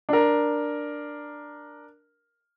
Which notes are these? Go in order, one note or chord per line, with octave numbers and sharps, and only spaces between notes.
D4 A#4